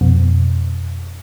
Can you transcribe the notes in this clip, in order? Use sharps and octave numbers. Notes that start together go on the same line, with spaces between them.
F2 B2